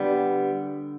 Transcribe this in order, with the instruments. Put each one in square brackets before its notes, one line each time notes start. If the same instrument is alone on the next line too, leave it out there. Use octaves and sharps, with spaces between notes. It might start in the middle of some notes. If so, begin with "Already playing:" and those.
Already playing: [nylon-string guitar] D3 [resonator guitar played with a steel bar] G3 B3